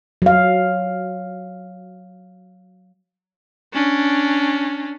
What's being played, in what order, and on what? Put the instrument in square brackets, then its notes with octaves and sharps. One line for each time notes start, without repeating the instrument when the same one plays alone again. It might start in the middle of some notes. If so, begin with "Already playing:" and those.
[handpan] F#3 F5
[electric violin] C#4 D4